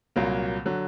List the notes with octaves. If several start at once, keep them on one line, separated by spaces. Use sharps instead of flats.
C2 A#2 F#3 A#3
D3 F#3